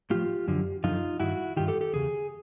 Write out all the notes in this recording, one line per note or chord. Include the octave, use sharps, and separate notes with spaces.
A2 F3 F4 G4
F#2 D3 F3
F#2 D3 F3 D#4 F4
G2 D#3 E4 F#4
G2 D#3 F4 G4
G4 A4
G4 A4
E2 C#3 G#4